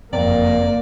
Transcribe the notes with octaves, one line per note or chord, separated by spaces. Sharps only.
F#1 F2 A#3 C4 D5 A#5